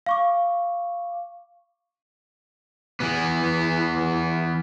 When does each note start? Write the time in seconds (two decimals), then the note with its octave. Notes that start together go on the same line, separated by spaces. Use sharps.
0.06 F5 C#6 D6
3.00 E3 B3